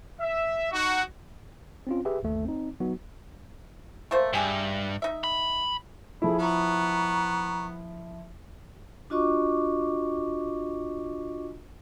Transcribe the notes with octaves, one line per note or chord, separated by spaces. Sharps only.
E5
D#4 F#4
C4 C#4 F4
G4 G#4 B4 E5
G1 D#2 A3
C4 D#4
F#3 B3 D#4 F#4
A3 A#3 C5
G2 G4 G#4 E5
D#4 E5
B5
F3 E4 G#4 A4 B5
B3 A#5 C#6
D4 F4 F#4 D#5 C#6 D6